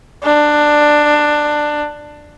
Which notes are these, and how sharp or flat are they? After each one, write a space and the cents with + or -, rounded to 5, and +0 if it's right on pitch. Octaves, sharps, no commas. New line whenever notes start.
D4 +15